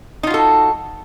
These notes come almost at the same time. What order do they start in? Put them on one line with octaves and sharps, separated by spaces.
D#4 F4 F#4 A4